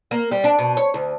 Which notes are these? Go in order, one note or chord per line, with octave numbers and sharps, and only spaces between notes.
A#3
G3
D4
B2
C#5
D2